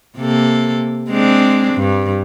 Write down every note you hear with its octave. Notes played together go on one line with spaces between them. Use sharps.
C3 A#3 A4
G#3 C4 D4
G2